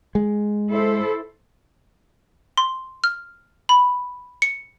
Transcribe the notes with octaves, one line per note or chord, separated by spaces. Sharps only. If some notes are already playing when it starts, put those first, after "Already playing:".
G#3
E4 A4 C5
C6
F6
B5
C#7